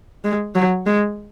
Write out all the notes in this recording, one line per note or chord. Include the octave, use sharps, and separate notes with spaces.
G#3
F#3
G#3